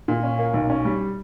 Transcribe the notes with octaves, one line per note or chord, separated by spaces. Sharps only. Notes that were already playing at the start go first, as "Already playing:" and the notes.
A#2
C#4
A#3
B1
C#4
G3